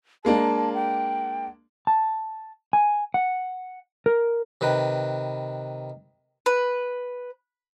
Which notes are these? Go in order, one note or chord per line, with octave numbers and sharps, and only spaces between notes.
G#3 A#3 D4 A5
G5
A5
G#5
F#5
A#4
C3 D#3 B4
B4